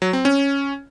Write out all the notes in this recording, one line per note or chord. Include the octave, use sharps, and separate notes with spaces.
F#3
C4
C#4